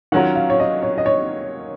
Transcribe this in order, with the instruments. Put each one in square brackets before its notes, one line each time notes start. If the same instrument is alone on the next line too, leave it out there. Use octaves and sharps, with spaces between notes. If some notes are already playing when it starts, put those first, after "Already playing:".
[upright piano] D#3 F#3 C#4 F4 A#4 [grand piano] F#5
[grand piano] F5
C#5
D#5
C#5
D#5
C#5